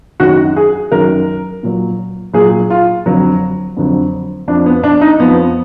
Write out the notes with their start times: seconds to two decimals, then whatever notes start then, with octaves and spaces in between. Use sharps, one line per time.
0.20 F#2 D#3 F#3 F#4
0.56 G#4
0.92 F#2 D#3 F#3 A#4
1.63 A#2 F#3
2.34 A#2 F#3 G#4
2.70 F4
3.06 F2 D3 F#3
3.77 F2 D3 F#3
4.48 F2 F3 D4
4.66 B3
4.83 D4
5.01 D#4
5.20 F2 F3 B3